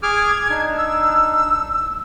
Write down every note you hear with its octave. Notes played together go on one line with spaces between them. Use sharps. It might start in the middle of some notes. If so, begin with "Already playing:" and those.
G#4 D6 F6 G#6
D4 D#4
E6